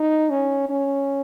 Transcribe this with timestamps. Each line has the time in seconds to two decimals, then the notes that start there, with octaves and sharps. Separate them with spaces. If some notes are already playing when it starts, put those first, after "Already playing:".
Already playing: D#4
0.30 C#4
0.69 C#4